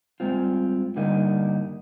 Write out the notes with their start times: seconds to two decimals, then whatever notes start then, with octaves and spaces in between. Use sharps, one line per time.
0.20 G2 D#3 G#3 C4 F4
0.96 G2 D3 G3 A#3 D#4